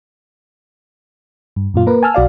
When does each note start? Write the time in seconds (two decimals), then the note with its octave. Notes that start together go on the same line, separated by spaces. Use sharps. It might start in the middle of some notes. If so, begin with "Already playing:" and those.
1.56 G2
1.74 F#2 A#2 F4
1.87 A#3 A#4 B4
2.03 G#5 A5 E6 F6
2.14 B1 F#4 D5 F5